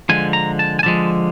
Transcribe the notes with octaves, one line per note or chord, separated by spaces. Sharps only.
D3 F3 G#3 G#5
A#5
A5
G#5
D3 F3 G#3 A5